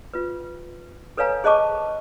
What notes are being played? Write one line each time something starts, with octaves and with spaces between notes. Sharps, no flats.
F4 B4
A4 B4 C#5 F5 G#5 A#5
G#4 C5 D#5 A5 C#6 D6